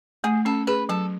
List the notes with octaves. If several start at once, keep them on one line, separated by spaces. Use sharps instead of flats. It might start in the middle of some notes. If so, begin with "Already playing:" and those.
A3 G#4
C#4 A4
G#4 B4
F#3 A4